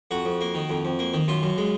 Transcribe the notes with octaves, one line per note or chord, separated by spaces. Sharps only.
F2 F#4
F2
A#3
D#3
F2
F2
A#3
D#3
F#2 F4
F#2
G#3